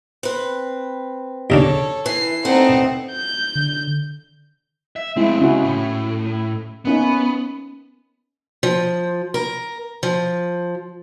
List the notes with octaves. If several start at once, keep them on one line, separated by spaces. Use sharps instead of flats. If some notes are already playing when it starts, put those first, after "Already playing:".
C4 B4
D#2 C#3 D4 A4 C#5
E3 C7
D3 A3 B3 C4 D#4 F#5
G6
D3
E5
G#3 A3 C4 E4
C#2 C#4 E4 F#4
A2
A#3 B3 C#4 D#4
F3
A#4
F3